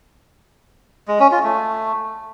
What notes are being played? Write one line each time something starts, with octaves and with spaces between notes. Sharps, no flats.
G#3
C#4
F4
A3